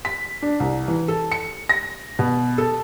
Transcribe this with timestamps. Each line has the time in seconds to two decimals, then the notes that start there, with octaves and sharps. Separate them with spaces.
0.05 B6
0.42 D4
0.60 C2
0.88 E3
1.08 A4
1.32 C#7
1.69 A#6
2.19 B2
2.58 A4